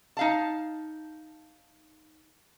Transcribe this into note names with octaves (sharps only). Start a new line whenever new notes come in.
D#4 F5 A5